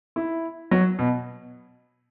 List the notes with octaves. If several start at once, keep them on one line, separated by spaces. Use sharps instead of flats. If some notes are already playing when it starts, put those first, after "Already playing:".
E4
F#3
B2